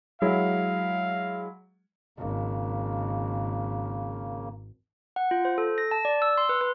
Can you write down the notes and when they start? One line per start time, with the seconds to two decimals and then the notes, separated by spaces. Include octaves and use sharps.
0.22 F#3 G#3 E4 F5
2.18 G#1 C#3 A#3
5.16 F#5
5.31 F4
5.45 C5
5.58 A4
5.78 A#6
5.91 A5
6.05 D5
6.22 E6
6.38 C6
6.49 B4
6.61 B4